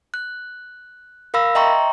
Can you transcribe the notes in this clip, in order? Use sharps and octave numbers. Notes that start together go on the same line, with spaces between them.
F#6
A#4 F5 B5 E6 A#6
D#5 E5 G5 A#5 C6 C#6